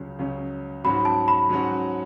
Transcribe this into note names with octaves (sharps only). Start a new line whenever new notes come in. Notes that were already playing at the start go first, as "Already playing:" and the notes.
Already playing: C#2 C#3 F#3 C#4
C#2 C#3 F#3 C#4
G#2 F#3 C#4 F#4 B5
A5
B5
G#2 F#3 C#4 F#4